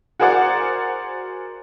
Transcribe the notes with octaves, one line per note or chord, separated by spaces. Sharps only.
F#4 G#4 A#4 C5 D5 F#5